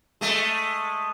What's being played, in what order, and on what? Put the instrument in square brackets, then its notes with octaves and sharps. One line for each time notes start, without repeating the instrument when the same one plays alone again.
[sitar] G#3 A3